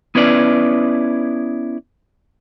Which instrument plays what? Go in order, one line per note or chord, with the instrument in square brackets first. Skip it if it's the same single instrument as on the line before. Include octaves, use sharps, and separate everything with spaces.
[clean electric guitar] B3 C#4 E4 B4 D5